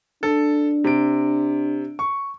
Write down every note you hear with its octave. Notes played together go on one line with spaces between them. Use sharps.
D4 A4
C3 D7
C#6